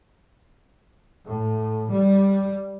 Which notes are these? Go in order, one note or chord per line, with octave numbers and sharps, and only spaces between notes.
A2
G3